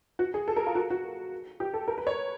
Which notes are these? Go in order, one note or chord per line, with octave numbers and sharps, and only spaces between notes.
F#4
G#4
A4
A#4
F4
F#4
F#4
G4
A4
A#4
B4
C#5